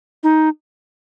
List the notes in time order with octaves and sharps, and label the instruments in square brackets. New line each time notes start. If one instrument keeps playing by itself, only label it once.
[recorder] D#4